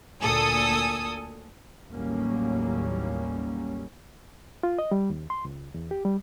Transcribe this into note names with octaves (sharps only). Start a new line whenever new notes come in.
D2 A#2 A4 G#5 D#6 E6
A1 D#2 F#3 G3 A#3 C#4
F4
D#5
G3
D#2
C6
C#2
E2
G4
G3